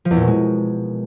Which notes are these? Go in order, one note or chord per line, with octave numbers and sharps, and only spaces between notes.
F3
E2
A#2
B2
G#3